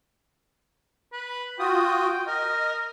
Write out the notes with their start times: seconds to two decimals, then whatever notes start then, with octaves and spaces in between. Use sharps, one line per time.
1.13 B4
1.59 F4 F#4 G5 D#6
2.27 A#4 D#5